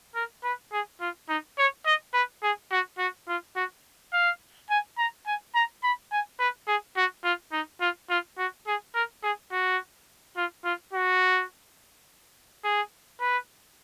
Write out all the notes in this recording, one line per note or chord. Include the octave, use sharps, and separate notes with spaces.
A#4
B4
G#4
F4
D#4
C#5
D#5
B4
G#4
F#4
F#4
F4
F#4
F5
G#5
A#5
G#5
A#5
B5
G#5
B4
G#4
F#4
F4
D#4
F4
F4
F#4
G#4
A#4
G#4
F#4
F4
F4
F#4
G#4
B4